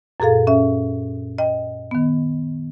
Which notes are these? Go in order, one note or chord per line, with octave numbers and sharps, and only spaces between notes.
F#2 A#2 G#4 A4 F5
C#4 E5
D#5 G5
D#3 B3